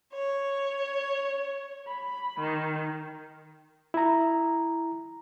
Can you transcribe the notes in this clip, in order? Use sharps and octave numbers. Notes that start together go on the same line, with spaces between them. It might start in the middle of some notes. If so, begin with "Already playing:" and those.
C#5
B5
D#3
E4 A#5